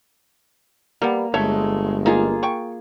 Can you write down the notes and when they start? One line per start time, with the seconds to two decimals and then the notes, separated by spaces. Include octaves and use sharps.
1.02 G3 A#3 B3
1.34 G1 G#3 A3 C#5 E5
2.06 A#3 D#4 F4 G#4
2.43 G5 C#6